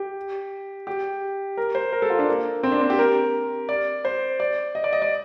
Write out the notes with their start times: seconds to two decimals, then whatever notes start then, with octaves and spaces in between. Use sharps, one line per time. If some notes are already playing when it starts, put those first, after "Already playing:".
Already playing: G4
0.87 G4
1.57 A#4
1.75 C5
1.92 A#4
2.02 A4
2.10 F4
2.19 D4
2.29 A#3
2.63 C4
2.72 D4
2.81 C4
2.90 G4
2.99 A#4
3.69 D5
4.05 C5
4.40 D5
4.75 D#5
4.84 D5
4.93 D#5
5.02 D5